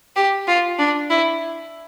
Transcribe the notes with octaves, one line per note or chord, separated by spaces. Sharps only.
G4
F4
D4
E4